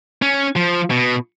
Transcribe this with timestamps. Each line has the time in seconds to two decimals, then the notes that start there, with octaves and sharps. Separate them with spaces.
0.22 C#4
0.56 F3
0.91 B2